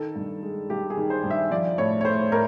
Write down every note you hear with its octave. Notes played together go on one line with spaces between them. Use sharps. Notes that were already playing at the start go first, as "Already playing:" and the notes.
Already playing: D#3 A4
G2
G#3
G2 G4
G#4
D#3
C5
G2
E5
F3 D5
A2 C#5
C#5
A3 C5
A2 A#4